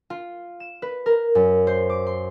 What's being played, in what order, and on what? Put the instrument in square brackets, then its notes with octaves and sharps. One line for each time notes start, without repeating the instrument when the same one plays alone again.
[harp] F4
E7
B4
A#4
F#2
C5
D6
C6